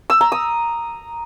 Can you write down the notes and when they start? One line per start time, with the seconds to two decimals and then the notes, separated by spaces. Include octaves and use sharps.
0.10 E6
0.21 A#5
0.32 D#6